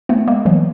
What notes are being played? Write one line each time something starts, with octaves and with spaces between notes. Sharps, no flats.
A3 B3
G#3 A#3
E3 F#3